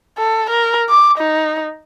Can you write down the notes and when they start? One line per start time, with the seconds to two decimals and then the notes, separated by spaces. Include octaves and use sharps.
0.18 A4
0.50 A#4
0.89 D6
1.18 D#4